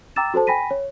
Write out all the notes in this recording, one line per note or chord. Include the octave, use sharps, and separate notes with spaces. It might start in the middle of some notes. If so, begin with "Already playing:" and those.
G5 A#5 D6 E6 A6 E7
F#4 A4 C5 A5
G5 G#5 B5 A#6 B6 D#7
C#5